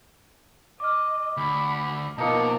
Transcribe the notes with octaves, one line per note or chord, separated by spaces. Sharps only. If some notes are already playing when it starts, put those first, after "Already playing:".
D#5 D6 F6
D2 B5
B2 F3 A#3 D#4 A5 A#5 C#7